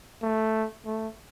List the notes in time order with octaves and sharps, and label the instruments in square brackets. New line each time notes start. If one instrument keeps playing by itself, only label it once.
[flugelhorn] A3
A3